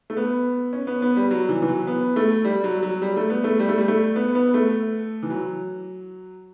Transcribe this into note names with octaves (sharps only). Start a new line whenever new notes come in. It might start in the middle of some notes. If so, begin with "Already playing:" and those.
A3
B3
C#4
B3
B3
G3
F#3
E3
E3
F#3
B3
A3
G3
F#3
F#3
G3
A3
B3
A3
G3
A3
G3
A3
B3
B3
A3
E3
F#3